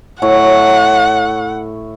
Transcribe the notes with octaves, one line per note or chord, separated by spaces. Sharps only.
A2 C#5 F#5